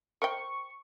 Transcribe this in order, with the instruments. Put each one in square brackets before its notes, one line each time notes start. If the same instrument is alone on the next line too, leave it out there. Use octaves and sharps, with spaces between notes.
[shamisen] A#4 C5 G5 [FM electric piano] C#6